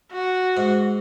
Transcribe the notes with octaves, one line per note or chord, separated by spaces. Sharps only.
F#4
G#2